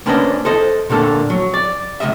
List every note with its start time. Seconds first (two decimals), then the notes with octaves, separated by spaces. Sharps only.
0.06 A#3 C#4 D4 B4 C5 D#5
0.45 A4 C5 D#5
0.90 A#2 D3 A#3 A4
1.30 F#3
1.54 D5
2.00 C#2 C3 D#5 E5